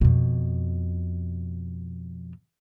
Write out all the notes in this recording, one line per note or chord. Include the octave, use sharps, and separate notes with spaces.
F2 B2